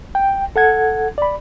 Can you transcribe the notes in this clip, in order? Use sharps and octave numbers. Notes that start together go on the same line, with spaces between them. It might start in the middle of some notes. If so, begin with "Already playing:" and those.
G5
A4 F#5 G#6
D5 B5